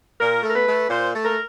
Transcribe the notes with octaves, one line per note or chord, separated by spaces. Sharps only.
A#2 A#4
A3
A#4
B4
A3
A#2 C5
A3
A#4